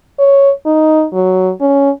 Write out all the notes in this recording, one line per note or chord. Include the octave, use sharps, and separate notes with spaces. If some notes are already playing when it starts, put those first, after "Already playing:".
C#5
D#4
F#3
C#4